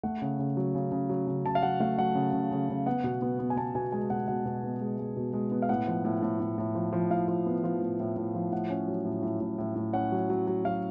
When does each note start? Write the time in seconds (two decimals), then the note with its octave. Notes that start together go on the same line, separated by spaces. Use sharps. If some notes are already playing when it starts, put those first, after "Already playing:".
0.03 A3 F#5
0.22 C#3
0.39 C#3
0.57 F#3
0.75 C#3
0.92 C#3
1.09 F#3
1.27 C#3
1.45 C#3 A5
1.55 F5
1.63 F#3 F#5
1.80 A3 F5
1.98 F#3 F#5
2.15 C#3
2.33 C#3
2.51 C#3
2.69 C#3
2.86 B3 F#5
3.04 B2
3.22 B3
3.39 B3
3.50 G#5
3.57 B3 A5
3.75 B2 G#5
3.92 G#3 G#5
4.10 B2 F#5
4.28 B2 F#5
4.45 B2
4.63 B3
4.81 G#3
4.99 G#3
5.16 B2
5.33 G#3
5.51 B3
5.62 F5
5.69 A2 F#5
5.87 F3
6.04 A2
6.22 A2
6.40 A2
6.58 A2
6.75 F3
6.93 F3
7.10 A2 F5
7.28 F3
7.46 B3
7.64 F3
7.82 A2
8.00 A2
8.16 A2
8.35 F3
8.52 A2 F#5
8.70 C#4
8.88 F#3
9.05 A2
9.23 A2
9.40 A2
9.58 A2
9.75 A2
9.93 C#4 F#5
10.12 F#3
10.30 F#3
10.47 F#3
10.65 F#3 F5